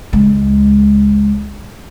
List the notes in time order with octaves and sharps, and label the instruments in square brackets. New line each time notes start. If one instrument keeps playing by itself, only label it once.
[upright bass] C#2 G#3